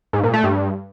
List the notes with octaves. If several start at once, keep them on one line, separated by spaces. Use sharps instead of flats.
G#2
A#2
A3
G2